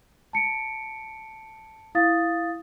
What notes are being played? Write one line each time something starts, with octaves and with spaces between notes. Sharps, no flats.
A5 C#7 D7
E4 F5 D#6 A6